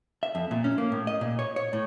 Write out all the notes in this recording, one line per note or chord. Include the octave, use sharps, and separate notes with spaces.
E5
F2
A#2
C#4
A#3
A2
D#5
A#2
C#5
C#5
A2